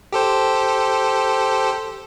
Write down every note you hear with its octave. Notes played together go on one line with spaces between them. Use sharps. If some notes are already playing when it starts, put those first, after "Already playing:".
G4 A4 C5